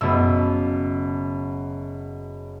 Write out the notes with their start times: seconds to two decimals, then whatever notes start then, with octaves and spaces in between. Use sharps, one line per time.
0.01 F#1 B2 E6